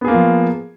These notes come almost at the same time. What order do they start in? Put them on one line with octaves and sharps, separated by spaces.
B3 G#4 A#3 F4 F3